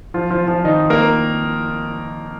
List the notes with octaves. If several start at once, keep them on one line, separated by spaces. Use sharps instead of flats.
F3 F4
F3 F4
F3 F4
D#3 D#4
A#3 A#4